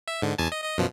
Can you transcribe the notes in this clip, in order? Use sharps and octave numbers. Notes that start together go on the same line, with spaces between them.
E5
G#2 D3
E2 G#5 A5
D#5
D#5
F#2 B2 F3